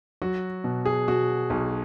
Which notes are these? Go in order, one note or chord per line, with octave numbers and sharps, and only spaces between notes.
F#3 F#4
B2
G#4
B2 F#4
B1